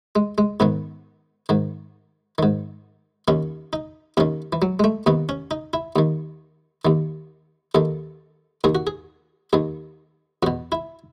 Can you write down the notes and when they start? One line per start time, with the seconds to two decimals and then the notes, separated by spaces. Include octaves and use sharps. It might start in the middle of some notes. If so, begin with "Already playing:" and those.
0.16 G#3
0.38 G#3
0.60 G#2 D#3 B3
1.49 G#2 D#3
2.38 G#2 D#3
3.28 D#2 D#3 C#4
3.73 D#4
4.17 D#2 D#3 C#4
4.53 E3
4.62 F#3
4.79 G#3
4.84 A3
5.06 D#2 D#3 B3
5.29 C#4
5.51 D#4
5.73 E4
5.96 D#2 D#3
6.85 D#2 D#3
7.75 D#2 D#3 A4
8.64 D#2 D#3 G#4
8.75 F#4
8.87 G#4
9.53 D#2 D#3 G#4
10.43 E2 B2 F#4
10.72 E4